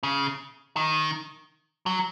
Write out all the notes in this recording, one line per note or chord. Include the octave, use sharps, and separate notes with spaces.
C#3
D#3
F#3